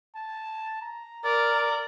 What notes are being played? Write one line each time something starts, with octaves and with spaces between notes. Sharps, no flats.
A5
A#5
A#4 D5